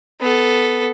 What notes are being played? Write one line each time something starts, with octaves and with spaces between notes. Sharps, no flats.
B3 A4